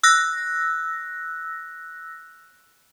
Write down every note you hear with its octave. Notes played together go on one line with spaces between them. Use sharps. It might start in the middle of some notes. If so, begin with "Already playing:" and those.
E6 F#6 A#6